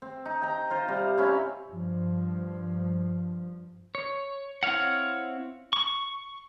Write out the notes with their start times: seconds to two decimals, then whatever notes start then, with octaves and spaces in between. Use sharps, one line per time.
0.02 C4
0.25 D#4
0.42 G5 A#5
0.70 F4 C5
0.88 C3 G3
1.17 C4 C#4 E4
1.68 G2 F3
3.95 C#5
4.63 C4 E4 C#5 F5 F#5
5.73 C#6